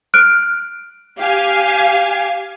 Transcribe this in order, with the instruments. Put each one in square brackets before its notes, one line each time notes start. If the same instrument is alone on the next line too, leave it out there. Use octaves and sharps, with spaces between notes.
[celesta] F6 F#6 D7
[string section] G4 F5 G#5